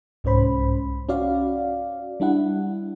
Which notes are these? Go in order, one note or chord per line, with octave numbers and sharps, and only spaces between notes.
C2 G#2 C#4 C5 B5
C#4 F#4 D5 F5
G3 D4 E4 F#5